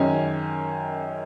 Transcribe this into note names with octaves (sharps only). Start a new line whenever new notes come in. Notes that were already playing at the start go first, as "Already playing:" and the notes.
Already playing: F#2 D#3 G#3 C#4 G#5